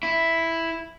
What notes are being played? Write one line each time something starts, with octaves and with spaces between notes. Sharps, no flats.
E4